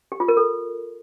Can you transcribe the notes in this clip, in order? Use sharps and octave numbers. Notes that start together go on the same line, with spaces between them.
G4
F4
A#4
A4